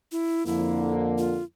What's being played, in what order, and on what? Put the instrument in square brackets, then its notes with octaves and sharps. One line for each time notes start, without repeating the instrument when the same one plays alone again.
[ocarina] E4
[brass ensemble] F2 D3 A#3 [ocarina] E4
[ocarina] F4